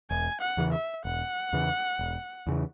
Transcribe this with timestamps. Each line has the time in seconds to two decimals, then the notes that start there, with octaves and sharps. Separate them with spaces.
0.10 E1 G#5
0.41 F#5
0.57 E2 C#3 E3
0.73 E5
1.05 E1 F#5
1.53 E2 C#3 E3
1.99 E1
2.47 E2 C#3 E3